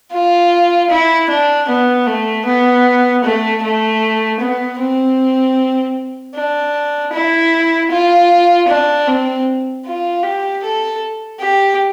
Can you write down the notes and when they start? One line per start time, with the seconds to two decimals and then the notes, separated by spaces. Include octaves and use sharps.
0.13 F4
0.90 E4
1.30 D4
1.69 B3
2.07 A3
2.46 B3
3.24 A3
3.62 A3
4.40 B3
4.79 C4
6.35 D4
7.13 E4
7.91 F4
8.69 D4
9.07 C4
9.85 F4
10.23 G4
10.63 A4
11.41 G4